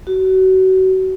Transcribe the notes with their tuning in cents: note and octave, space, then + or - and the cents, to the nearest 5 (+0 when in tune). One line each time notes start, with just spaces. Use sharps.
F#4 +30